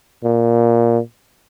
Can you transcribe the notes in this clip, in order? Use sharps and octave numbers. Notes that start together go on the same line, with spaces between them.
A#2